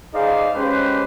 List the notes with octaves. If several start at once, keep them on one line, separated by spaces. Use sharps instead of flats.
D#4 G#4 C5 D5 F5
G#3 C#4 G4 B4 C5